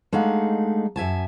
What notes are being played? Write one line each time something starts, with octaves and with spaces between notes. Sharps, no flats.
G#3 A3 D4 D#4 F5 F#5
F#2 E5 G#5 A5